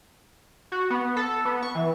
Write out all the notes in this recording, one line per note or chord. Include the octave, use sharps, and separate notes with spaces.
F#4
B3
A4
B3
C#6
E3